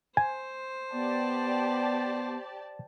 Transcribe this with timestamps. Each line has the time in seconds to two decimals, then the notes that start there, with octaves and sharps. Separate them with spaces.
0.17 C5 G#5
0.93 B3 G4 D5 A5